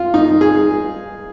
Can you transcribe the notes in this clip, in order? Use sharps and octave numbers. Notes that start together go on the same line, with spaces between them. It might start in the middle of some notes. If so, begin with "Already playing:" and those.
Already playing: F4
D#4
G#4